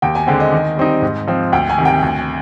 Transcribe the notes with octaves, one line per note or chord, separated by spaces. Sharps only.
D#2 G5
G#5
D3 G#3 C4 G5
D#5
D#3
G3 C4 D#4
G#2
F3 C4
D2 G5
G#5
C3 D#3
G5
D2